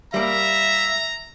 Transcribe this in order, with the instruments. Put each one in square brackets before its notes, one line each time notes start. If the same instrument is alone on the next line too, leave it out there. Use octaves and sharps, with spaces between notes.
[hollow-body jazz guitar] G3 A#3 [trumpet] E5 [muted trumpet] A#5